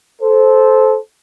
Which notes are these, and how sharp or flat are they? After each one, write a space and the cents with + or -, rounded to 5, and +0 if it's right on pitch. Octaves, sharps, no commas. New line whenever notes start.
A4 -20 C5 +0